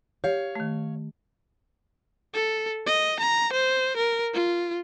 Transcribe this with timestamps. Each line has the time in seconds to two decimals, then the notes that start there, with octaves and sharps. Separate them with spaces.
0.24 G4 C#5 F5
0.55 D#3 A3
2.34 A4
2.86 D#5
3.20 A#5
3.53 C5
3.97 A#4
4.34 F4